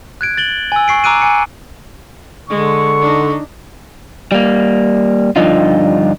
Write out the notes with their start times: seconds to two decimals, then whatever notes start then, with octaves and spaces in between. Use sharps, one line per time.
0.21 F#6 G#6 D7
0.37 A6 F#7 G7
0.72 G#5 E6
0.88 C#6 C7 D7
1.04 A#5 D6 E6 F#6 D7 D#7
1.22 G#5 C#7
2.49 D3 G#3 C#6
3.01 D4 D#4
4.32 G3 A#3
5.36 G2 D3 F3 D#4 F4